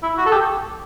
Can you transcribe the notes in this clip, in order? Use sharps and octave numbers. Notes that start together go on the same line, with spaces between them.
E4
F#4
A4
G4